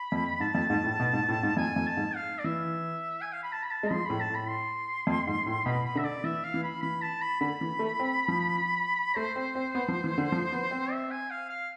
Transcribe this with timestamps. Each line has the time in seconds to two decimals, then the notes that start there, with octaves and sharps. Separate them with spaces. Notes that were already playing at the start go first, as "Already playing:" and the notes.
Already playing: B5
0.12 F2
0.40 G#2 A5
0.55 F2
0.70 G#2
0.84 A2
1.00 B2
1.13 G#2
1.28 A2
1.43 G#2
1.57 F2 G#5
1.76 F2
1.87 A5
1.97 G#2
2.15 F5
2.39 D5
2.44 E3 E5
3.21 G#5
3.33 F5
3.43 B5
3.53 A5
3.63 B5
3.71 A5
3.83 G#3
3.91 F3 C6
4.05 A2 B5
4.20 A5
4.30 A2 B5
4.49 C6
5.07 F2
5.27 G#2
5.46 A2
5.66 B2 B5
5.86 B5
5.95 D3 E5
6.04 D5
6.24 E3 E5
6.44 F5
6.54 E3
6.64 B5
6.82 E3 B5
7.02 A5
7.21 B5
7.40 D3 B5
7.61 E3
7.79 A3
8.00 C4
8.28 F3
9.16 A3 C5
9.36 C4
9.55 C4
9.75 B3
9.88 F3
10.04 E3
10.18 D3
10.32 F3
10.52 B3
10.71 C4
10.92 E5
11.11 G#5
11.31 F5
11.50 F5